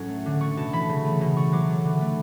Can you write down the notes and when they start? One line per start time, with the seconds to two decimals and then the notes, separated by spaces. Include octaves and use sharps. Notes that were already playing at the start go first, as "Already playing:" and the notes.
Already playing: A2 F#3 C#4
0.09 A3
0.26 D3
0.41 A3 C#6
0.57 B2 A5
0.73 E3 B5
0.89 C#3
1.05 A3
1.21 B2
1.36 A3 C#6
1.53 F#3 D6
1.69 A3
1.84 D3
2.01 A3